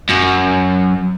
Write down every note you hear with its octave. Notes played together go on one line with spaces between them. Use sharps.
F#2